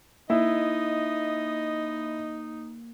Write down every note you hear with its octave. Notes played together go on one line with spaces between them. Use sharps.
A#3 D#4 E4 D#5 E5